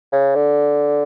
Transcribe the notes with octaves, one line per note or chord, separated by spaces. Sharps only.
C#3
D3